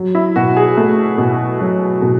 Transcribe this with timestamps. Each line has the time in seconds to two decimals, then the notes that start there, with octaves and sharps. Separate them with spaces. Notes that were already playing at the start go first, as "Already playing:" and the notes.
Already playing: F#3
0.15 E4
0.36 B2 F#4
0.57 G#4
0.77 A3
1.18 B2
1.60 F#3
2.02 B2